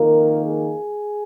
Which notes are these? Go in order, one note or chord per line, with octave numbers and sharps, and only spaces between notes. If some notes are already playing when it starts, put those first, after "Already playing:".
Already playing: F2 D#3 A#3 A#4
G#4